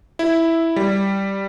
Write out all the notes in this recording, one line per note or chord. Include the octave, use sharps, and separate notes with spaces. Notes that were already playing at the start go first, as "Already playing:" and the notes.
E4
G3